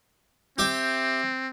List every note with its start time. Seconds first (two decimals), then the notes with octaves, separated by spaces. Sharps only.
0.58 C4 G4 E5